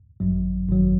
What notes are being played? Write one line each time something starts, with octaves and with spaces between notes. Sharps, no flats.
G#1 F#2 F#3
G#1 F#2 F#3